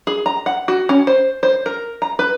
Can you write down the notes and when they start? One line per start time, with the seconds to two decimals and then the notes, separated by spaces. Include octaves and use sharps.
0.07 G#4
0.26 A#5
0.46 F#5
0.68 F#4
0.89 C#4
1.07 C5
1.43 C5
1.66 A#4
2.02 A#5
2.19 B4